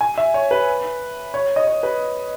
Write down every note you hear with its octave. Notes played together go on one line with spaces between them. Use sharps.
G#5
E5
C#5
B4
C#5
D#5
C#5
B4